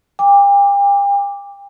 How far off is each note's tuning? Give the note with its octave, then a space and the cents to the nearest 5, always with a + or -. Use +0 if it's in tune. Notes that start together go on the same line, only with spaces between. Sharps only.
G5 +40 D6 -5